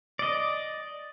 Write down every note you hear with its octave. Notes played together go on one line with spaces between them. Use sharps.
D5 D#5